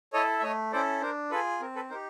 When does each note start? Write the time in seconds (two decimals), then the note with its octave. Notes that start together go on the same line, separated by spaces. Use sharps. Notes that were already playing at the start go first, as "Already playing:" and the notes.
0.13 E4 A4 C#5 D#5
0.39 E5
0.43 A3 C#5 D#5
0.72 C#4 E4 A4 C5 D5
1.01 D4 A#4 C5
1.31 F4 G#4 A4 B4
1.61 C4 A#4
1.76 A4 B4
1.90 D#4 A#4 C5
1.94 G4